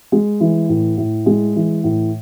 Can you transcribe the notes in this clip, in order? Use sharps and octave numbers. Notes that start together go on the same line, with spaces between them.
G#3
E3
A2
A2
G#3
E3
A2